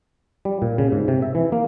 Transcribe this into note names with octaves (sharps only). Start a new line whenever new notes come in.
G3
A#2
C#3
G#2
C3
E5
E3
A#3